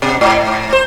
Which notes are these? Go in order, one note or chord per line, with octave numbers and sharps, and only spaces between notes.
B2
G#2
C5